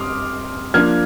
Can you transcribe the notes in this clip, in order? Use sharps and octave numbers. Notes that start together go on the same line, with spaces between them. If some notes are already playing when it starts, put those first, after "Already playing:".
Already playing: G3 C4 C6 D6 D#6 F6
F3 A#3 D4 F6 G#6